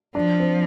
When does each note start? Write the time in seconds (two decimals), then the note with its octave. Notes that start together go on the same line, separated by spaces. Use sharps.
0.15 F3 D4
0.40 C4